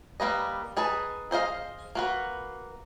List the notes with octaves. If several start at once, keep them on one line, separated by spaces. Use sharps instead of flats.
G3 A#3 B4 D#5
D#4 G#4 B4 A5
G#4 C5 D#5 F5
A#3 F#4 B4